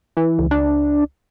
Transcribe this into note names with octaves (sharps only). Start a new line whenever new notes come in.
E3
C#2
D4